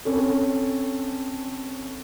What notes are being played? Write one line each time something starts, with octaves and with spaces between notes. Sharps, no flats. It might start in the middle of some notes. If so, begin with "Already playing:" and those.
C4 C#4 A4